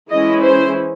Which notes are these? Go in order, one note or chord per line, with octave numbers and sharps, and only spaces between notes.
E3 G#3 C#4 E4 D#5
C5